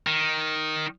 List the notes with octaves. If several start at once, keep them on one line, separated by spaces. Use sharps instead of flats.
D#3